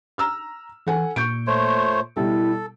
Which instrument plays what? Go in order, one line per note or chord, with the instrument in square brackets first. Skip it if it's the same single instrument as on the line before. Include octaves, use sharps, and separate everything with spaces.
[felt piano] A#5 E6 F6
[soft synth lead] E3 [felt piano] A4 F#5 G#5
[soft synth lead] A#2 [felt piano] C#6 G6 D7
[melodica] A3 C5 C#5
[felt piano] B2 G3 [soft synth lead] E4 [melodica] A4